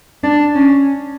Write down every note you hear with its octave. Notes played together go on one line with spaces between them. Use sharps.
D4
C#4